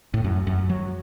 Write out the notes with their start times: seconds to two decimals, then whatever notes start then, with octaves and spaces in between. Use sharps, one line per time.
0.14 A2
0.24 F#2
0.47 F#2
0.70 F#3